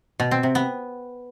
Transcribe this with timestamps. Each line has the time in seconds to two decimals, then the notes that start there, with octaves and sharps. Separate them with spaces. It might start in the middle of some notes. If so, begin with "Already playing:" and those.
0.20 B2
0.31 C4
0.43 C3
0.55 B3